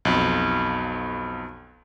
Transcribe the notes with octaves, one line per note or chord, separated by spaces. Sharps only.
B1 F2